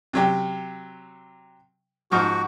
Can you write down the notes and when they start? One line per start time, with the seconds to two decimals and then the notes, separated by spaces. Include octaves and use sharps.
0.13 C3 F#3 G4
2.12 G#2 F3 F#4 F6